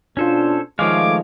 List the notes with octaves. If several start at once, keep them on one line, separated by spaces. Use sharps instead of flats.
B2 C#4 D4 F4 A4 C5
D#3 F3 G#3 A3 C#5 F5 D6